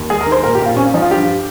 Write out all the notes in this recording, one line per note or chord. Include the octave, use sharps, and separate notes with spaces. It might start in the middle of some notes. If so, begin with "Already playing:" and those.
Already playing: D#2
G#3 G#4
A#4
D#3
C5
A#2 A#4
G4
A#2
F4
C4 C#4
F3 D#4
F4
G2 G4